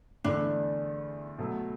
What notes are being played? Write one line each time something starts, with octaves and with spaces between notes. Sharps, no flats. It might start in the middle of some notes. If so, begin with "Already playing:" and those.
E2 D3 A3 D4 E4
B2 F#3 A3